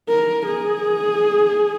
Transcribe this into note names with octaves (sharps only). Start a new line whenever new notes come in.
A#4
G#4